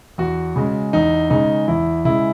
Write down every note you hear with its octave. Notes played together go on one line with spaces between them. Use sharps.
E2 F#4
C#3 G#3
E2 D#4
C#3 G#3 D#4
E2 E4
C#3 G#3 E4